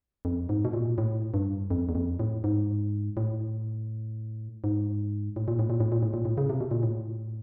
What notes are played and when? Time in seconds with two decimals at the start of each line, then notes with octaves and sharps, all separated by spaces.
0.25 F2
0.49 G#2
0.65 B2
0.73 A#2
0.98 A2
1.34 G2
1.71 F2
1.89 E2
1.95 F2
2.20 A2
2.44 G#2
3.17 A2
4.64 G#2
5.36 A2
5.48 A#2
5.59 A2
5.70 A#2
5.80 A2
5.92 A#2
6.02 A2
6.13 A#2
6.25 A2
6.38 C#3
6.50 C3
6.60 B2
6.71 A#2
6.83 A2